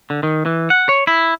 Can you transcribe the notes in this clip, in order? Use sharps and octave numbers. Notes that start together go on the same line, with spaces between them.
D3
D#3
E3
F#5
C#5
E4